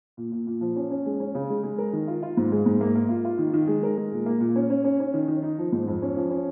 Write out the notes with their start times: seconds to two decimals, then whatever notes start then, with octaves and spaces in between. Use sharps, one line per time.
0.17 A#2
0.32 A#2
0.47 A#2
0.61 F3
0.76 C#4
0.91 C#4
1.06 G#3
1.20 C#4
1.35 C#3
1.50 G#3
1.63 G#3
1.78 A#4
1.93 D#3
2.08 F4
2.23 F4
2.37 G#2
2.52 G#3
2.66 G#2
2.81 A#3
2.95 A#3
3.09 F4
3.25 F4
3.39 D#3
3.53 D#3
3.67 G#3
3.83 A#4
3.97 G#3
4.12 A#2
4.26 A#3
4.40 A#2
4.56 C#4
4.70 C#4
4.84 C#4
5.00 C#4
5.14 D#3
5.28 D#3
5.43 D#4
5.58 F3
5.72 G#2
5.88 F2
6.02 C#4
6.17 F3
6.31 C#4